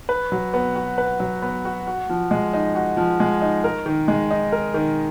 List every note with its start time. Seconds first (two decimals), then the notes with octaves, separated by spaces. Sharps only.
0.09 B4
0.32 F#3
0.54 B3
0.75 F#4
0.98 B4
1.20 F#3
1.42 B3
1.65 F#4
1.87 F#4
2.09 F3
2.31 G#3
2.53 D#4
2.75 F#4
2.97 F3
3.20 G#3
3.42 D#4
3.64 A#4
3.86 D#3
4.08 G#3
4.31 D#4
4.52 A#4
4.74 D#3